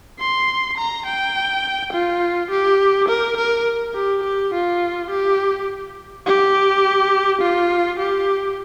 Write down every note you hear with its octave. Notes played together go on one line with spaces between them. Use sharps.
C6
A#5
G5
F4
G4
A#4
A#4
G4
G4
F4
G4
G4
F4
G4